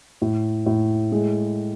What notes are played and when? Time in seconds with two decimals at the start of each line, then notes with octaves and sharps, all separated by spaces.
0.22 A2
0.66 A2
1.12 G#3